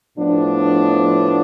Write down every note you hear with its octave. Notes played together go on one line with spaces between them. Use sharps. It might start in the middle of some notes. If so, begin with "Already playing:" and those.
A2 F3 B3 D4